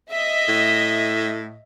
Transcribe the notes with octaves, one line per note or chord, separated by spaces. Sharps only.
D#5 E5
A2